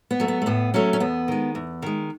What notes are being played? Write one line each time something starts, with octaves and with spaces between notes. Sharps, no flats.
B3
F#3 A3
B3
A3
A2 B3
F#3 A3 C#4
C#4
E2 B3
D#3 G#3
E2
D#3 G#3